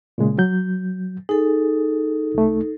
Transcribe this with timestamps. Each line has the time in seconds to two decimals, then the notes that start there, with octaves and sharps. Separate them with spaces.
0.18 A#2 C#3 G#3
0.38 F#3 G6
1.29 D#4 G#4 A4
2.35 C2 A3